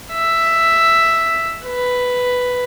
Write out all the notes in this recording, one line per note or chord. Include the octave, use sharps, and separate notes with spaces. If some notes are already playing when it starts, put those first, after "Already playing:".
E5
B4